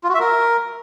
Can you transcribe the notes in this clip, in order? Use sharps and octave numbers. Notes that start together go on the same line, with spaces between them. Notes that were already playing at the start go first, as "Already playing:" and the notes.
F4
F#4
E5
A#4